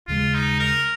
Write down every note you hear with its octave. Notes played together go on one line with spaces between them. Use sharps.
D#2 C#3 G#3 F4
D#4
A#4